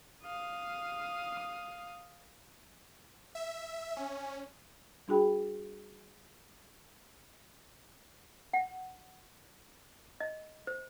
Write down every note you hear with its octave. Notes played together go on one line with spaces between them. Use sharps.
F5 D#6
E5
C#4
G3 D4 F#4 G#4 G5 B5
F#5
D#5
C5